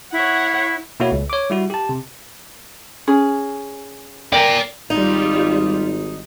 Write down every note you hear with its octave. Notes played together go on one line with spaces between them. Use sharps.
E4 C#5 F#5
B2 A#3 E4 F#4 C#5
C#2
C#5 D6
G3 E4 F#4
G4 A5
C3
C#4 G#4
A#4 D5 G5 A#5
G#1 G3 D#4 F4